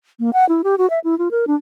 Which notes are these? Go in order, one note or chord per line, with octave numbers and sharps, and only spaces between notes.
A#3
F#5
E4
G4
F#4
E5
E4
F4
A#4
D4